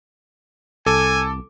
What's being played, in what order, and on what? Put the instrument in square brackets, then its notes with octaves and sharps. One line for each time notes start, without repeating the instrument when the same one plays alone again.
[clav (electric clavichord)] C2 [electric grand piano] A4 [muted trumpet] G#5 [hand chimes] D6